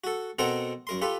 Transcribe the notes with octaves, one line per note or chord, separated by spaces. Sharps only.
F#4 A4
B2 C4 A4 A#4 F#5 A#5
F#2 A#4 C6
F4 G4 A4 B4